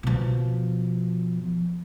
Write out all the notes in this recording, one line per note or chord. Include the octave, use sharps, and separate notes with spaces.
B2 F3